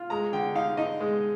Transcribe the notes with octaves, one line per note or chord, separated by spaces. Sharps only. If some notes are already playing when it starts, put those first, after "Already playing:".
Already playing: F4
G#3 A#5
D3 G5
D#4 F5
D#4 D#5
G#3